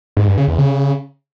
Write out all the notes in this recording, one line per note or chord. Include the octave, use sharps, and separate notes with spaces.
G#2
G2
C#3
E2
C#3